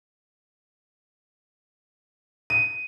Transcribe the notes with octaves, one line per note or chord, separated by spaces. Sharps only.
D#7